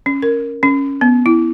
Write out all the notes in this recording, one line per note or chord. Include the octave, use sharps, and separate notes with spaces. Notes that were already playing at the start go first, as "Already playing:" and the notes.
C#4
A#4
C#4
B3
E4